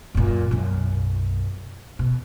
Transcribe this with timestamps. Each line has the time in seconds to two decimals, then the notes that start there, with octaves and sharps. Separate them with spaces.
0.14 F#2 A#2
0.51 B1 F#2
1.99 B2